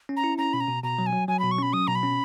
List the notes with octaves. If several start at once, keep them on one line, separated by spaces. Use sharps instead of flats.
C#4
A#5
E4
C#4 A#5
B2 B5
A#5
B2
B2 A#5
F#3
G#5
F#3
F#3 G#5
B2 B5
C#6
C#4 B5
F#3 D#6
B2 A#5
B5
C#4